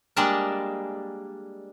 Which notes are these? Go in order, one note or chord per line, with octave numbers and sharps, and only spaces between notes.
G3 G#3 A#3 D4 A#4 A5